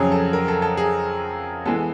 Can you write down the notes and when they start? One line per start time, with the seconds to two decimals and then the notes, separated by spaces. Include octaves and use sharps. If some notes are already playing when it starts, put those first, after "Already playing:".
Already playing: F2 C#3 F#3 G#4
0.12 A4
0.33 A#4
0.48 A4
0.62 A4
0.77 G#4
1.65 E3 G#3 B3 A4